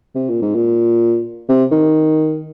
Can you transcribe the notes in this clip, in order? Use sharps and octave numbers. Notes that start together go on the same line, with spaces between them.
C3
A#2
G#2
A#2
C3
D#3